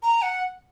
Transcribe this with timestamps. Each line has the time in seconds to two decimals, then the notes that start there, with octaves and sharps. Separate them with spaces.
0.03 A#5
0.22 F#5